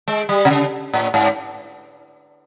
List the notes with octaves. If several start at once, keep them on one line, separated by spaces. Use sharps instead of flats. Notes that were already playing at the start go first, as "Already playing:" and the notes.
G#3
G3
C3
C#3
A2
G#2